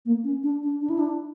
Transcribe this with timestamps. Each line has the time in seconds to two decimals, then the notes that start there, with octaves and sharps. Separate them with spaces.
0.05 A#3
0.24 C#4
0.43 D4
0.63 D4
0.81 D4
0.90 E4
0.99 D4